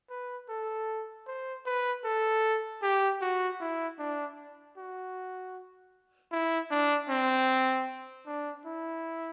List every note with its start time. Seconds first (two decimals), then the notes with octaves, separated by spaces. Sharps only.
0.10 B4
0.49 A4
1.27 C5
1.66 B4
2.04 A4
2.83 G4
3.21 F#4
3.60 E4
3.99 D4
4.77 F#4
6.32 E4
6.71 D4
7.09 C4
8.27 D4
8.66 E4